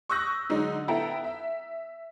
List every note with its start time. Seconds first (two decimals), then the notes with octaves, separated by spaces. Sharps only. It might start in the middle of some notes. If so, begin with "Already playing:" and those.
0.09 C#6 D#6 E6 F#6 G6 A#6
0.49 D3 F#3 G#3 D#4
0.88 B3 E4 A4 G5 A#5
1.24 E5